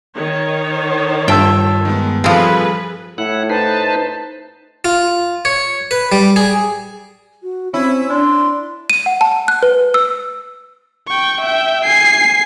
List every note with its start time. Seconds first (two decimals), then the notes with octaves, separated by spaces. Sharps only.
0.15 D#3 C#5
1.28 G2 F4 E5 G5 A5 E6
1.85 D#3 G#3 B3
2.24 F3 G3 C4 G#4 A4 B4 B5
3.18 A2 E4 F#5
3.50 D#4 B4 C5 A5
4.85 F4
5.45 C#5
5.91 B4
6.12 G3
6.36 G#4
7.43 F#4
7.74 C4 C#4 E4
8.10 D4 C6
8.90 D#7
9.06 F#5
9.21 A5
9.48 F#6
9.63 B4
9.94 E6
11.08 G5 C#6
11.41 E5 G5
11.85 G#5 C7